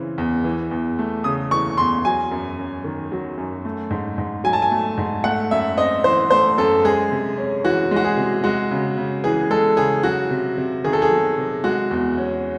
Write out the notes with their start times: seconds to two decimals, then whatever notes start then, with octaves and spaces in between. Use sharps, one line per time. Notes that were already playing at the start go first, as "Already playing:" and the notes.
Already playing: C#3 E3 C4
0.18 E2
0.44 E3
0.71 E2
0.99 A3
1.24 C#3 D#6
1.51 E3 C#6
1.78 E2 C6
2.05 F#3 G#5
2.31 F#2
2.59 F#2
2.84 D#3
3.12 F#3
3.37 F#2
3.65 A3
3.91 G#2
4.18 G#2
4.44 F#3 G#5
4.53 A5
4.62 G#5
4.71 A3
4.98 G#2
5.24 A3 F#5
5.51 F#2 E5
5.78 C4 D#5
6.04 E3 C5
6.30 A3 C5
6.57 F#2 A4
6.85 G#3 G#4
7.12 C3
7.38 C#4
7.65 E3 F#4
7.91 G#3
7.96 F#4
8.05 G#4
8.17 C3
8.44 G#3 F#4
8.71 C#3
8.97 C#3
9.24 E3 G#4
9.50 G#3 A4
9.77 C#3 G#4
10.03 F#3 F#4
10.31 C3
10.58 C3
10.84 D#3 G#4
10.93 A4
11.02 G#4
11.10 F#3
11.38 C3
11.64 G#3 F#4
11.91 E2
12.18 C#4